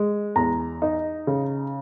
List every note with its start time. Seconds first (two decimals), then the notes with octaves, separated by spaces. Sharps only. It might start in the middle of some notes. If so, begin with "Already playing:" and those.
Already playing: G#3
0.36 E2 A#5
0.82 D#4
1.27 C#3